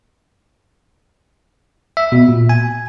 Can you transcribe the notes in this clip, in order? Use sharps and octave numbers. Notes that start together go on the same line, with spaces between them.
E5
B2
A#2
G#5